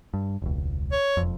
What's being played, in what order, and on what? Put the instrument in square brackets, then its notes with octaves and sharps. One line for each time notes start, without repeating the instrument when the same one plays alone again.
[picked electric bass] G2
E1 C#2
[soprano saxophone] C#5
[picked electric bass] E1 F2